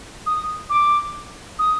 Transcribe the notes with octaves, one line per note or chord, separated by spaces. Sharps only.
D#6
D6
D#6